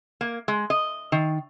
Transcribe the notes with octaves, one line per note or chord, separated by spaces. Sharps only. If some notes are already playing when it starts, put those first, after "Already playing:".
A#3
G#3
D#5
D#3